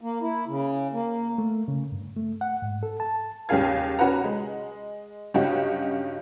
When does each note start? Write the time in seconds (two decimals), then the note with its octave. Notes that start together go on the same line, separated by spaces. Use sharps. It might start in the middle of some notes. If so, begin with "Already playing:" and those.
0.01 A#3
0.22 E4
0.48 C#3
0.93 A#3
1.38 A3
1.68 C#3
1.92 G2
2.17 A3
2.41 F#5
2.62 G#2
2.83 A4
3.00 A5
3.49 D#2 G3 C#4 G#4 F5 G#6
3.99 C#4 F#4 B4 F#5 A#5
4.24 G#3
5.34 G2 C#3 C#4 D#4 F#4 G4